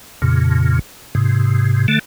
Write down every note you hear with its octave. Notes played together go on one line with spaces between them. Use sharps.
F2 A#2 C#3
G#2 C3
D3 A3